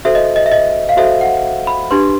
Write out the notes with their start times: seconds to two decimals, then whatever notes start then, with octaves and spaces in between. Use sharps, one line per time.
0.05 F#4 A4 C5 E5
0.15 D#5
0.36 D#5
0.46 E5
0.52 D#5
0.89 F5
0.97 F#4 A4 C5 E5
1.21 F#5
1.67 B5
1.91 D4 G4 B4 C6